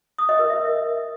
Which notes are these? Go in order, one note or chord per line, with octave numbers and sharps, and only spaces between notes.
D#6
D#5
A#4
E5